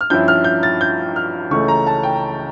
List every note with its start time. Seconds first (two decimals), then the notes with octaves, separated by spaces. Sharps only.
0.01 F6
0.10 G2 F3 C#4 E4 G6
0.28 F6
0.44 G6
0.63 A6
0.81 G6
1.16 F6
1.50 C#2 C#3 E3 A3 C#4 C#6
1.68 A#5
1.86 A5
2.03 G5